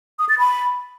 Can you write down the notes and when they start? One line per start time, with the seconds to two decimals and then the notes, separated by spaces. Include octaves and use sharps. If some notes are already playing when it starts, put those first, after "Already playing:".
0.19 D#6
0.29 A6
0.39 B5